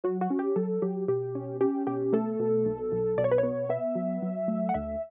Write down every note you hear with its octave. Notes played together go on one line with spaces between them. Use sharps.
F#3 F#4
F#4
C#4
G4
F#3 A4
F#3 G4
B2 G4
C#4
C#4 G4
B2 G4
A3 A4
B2
B1
B1
B2 D5
C#5
B4
C#5
B3
B3 E5
F#3
F#3
A3
F#5
D2 E5